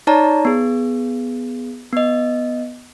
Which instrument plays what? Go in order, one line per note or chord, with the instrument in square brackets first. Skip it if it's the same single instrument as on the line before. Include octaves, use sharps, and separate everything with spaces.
[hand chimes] D#4 C#5 D5 A5 A#5
B3 G#4
B3 D#5